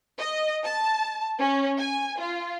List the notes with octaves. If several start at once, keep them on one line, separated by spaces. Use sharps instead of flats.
D#5
A5
C#4
G#5
F4